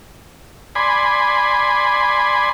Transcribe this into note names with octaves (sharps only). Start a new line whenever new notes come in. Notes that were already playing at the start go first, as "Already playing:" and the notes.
D5 G#5 B5 C6